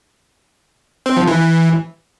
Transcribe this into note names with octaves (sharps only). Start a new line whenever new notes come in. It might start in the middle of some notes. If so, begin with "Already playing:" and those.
C4
F3
E3